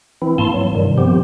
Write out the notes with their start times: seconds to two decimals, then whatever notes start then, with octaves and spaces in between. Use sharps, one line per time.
0.22 E3 C4 E4
0.38 G#2 A#3 E4 A5 C6
0.54 F#3
0.75 G2 C3 D#3 G3
0.98 F3 B3 C4 G4